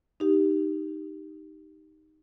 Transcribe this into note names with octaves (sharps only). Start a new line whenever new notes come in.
D#4 G4